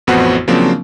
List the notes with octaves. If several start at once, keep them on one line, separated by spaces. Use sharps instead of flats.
A1 F2 B3 F#4 C5 F#5
C#3 F3 F#3 A#3 C4 D4